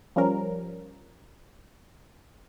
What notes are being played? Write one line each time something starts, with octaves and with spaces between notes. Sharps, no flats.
F3 G3 C#4 A#4